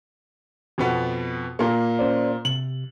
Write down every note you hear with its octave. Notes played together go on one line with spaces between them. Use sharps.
F2 B2 B3
A#2 A#3
C#4 C5 D5
C3 F#7